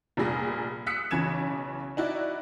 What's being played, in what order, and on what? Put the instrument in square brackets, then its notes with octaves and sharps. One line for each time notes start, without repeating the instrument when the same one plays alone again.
[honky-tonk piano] F1 A#2 G3 G#4 A#6
D#6 E6 F#6 B6 C#7
B1 C#3 E3 G#6 E7
D#4 E4 F#4 D5